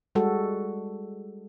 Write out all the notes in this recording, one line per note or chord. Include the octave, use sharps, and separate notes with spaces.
G3 G#3 F#4 A4